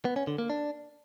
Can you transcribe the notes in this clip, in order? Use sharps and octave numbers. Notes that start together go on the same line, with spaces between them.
B3
C#4
D3
A#3
D4